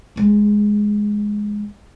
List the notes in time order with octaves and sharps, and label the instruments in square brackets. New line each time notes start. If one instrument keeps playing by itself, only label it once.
[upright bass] A#1 G#3